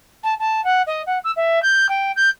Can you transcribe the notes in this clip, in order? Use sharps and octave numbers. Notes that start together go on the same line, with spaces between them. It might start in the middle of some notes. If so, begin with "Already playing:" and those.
A5
A5
F#5
D#5
F#5
E6
E5
G6
G5
G6